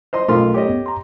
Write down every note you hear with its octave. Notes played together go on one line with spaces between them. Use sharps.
C5 D#5 C6
B1 A3 F4 A4 A#4 C6
G4 C#5 D#5
B3
A#5 C6